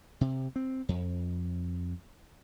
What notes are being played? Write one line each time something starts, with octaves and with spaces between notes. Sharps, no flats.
C3
C4
F2